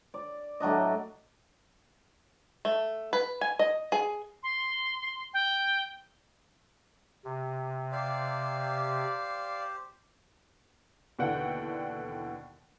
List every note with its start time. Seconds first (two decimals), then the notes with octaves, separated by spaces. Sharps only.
0.14 D5
0.60 A2 F#3 D4 D#5
2.65 A3
3.13 B4
3.41 G#5
3.59 D#5
3.92 G#4
4.43 C6
5.34 G5
7.25 C3
7.92 G4 C5 D5 F5
11.19 D#2 B2 D3 E3 F#5 G5